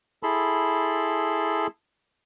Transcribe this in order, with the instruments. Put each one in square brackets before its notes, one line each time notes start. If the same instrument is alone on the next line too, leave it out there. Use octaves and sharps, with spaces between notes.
[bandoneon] E4 G#4 A4 A5 B5 C6